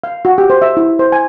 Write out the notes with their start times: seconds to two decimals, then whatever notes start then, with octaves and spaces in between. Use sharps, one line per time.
0.04 F5
0.25 F#4
0.38 G4
0.50 C5
0.62 E5
0.77 E4
0.99 C5
1.12 G#5